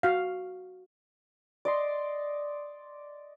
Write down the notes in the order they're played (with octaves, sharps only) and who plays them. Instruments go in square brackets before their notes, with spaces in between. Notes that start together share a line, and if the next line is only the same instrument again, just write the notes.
[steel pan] F#4 F5
[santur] D5 D#5 C6